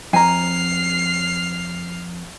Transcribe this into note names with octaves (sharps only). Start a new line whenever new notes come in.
F2 G#5 A#5 F6 C7